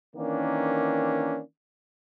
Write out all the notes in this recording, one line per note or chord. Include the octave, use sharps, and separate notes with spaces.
D#3 E3 A#3 C#4 D4